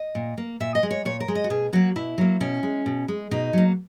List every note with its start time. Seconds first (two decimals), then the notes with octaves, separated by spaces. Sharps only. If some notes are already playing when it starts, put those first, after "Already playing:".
Already playing: D#5
0.15 A#2
0.38 A#3
0.60 A#2 E5
0.75 D#5
0.83 G#3
0.91 C#5
1.05 A#2 C#5
1.20 A#4
1.28 G#3
1.35 D#5
1.44 F#4
1.50 B2 G#4
1.73 F#3 A#3 F#4
1.96 B2 E4
2.18 F#3 A#3
2.40 B2 C#4
2.63 G#3
2.86 B2
3.08 G#3
3.31 B2 D#4
3.53 F#3 A#3